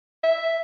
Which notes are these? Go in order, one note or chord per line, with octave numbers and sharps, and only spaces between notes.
E5